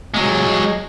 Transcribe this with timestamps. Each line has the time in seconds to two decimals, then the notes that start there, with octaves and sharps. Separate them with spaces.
0.14 F#3 G#3